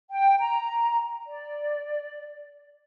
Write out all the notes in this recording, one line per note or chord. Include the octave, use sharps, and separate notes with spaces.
G5
A#5
D5